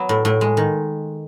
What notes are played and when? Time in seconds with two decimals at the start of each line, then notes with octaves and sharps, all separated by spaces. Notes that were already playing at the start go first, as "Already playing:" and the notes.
Already playing: F#3 B3
0.09 A2
0.25 A2
0.41 G#3
0.57 D#3